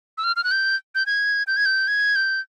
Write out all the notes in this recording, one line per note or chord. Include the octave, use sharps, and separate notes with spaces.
E6
F6
F6
F#6
G6
G6
G#6
G6
G#6
G6
G#6
G6